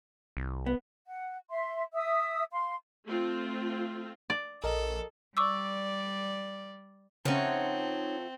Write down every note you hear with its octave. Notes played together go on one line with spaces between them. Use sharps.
C2
B3
F#5
E5 C6
E5 D#6 E6
F5 C6
A3 C4 F4
D5
A#1 A4 A#4 D#5
G3 D5 C#6 D6 E6
C#3 F3 A3 C4 C#4 D#4 C#5 F#5